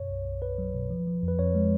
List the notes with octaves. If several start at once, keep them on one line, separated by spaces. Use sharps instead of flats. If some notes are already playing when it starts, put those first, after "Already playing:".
Already playing: F#2 B2 C#5
B1
B1
B1 B4
F#3
B2
F3
F3
F2
B4
F2 C#5
G#3